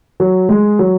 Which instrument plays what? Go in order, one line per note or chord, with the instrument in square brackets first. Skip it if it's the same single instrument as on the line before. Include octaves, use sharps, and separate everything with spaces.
[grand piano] F#3
G#3
F#3